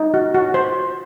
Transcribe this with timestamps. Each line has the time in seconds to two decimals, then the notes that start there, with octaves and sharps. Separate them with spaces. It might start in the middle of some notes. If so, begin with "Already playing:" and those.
Already playing: D#4
0.14 F#4
0.34 F#4
0.54 C5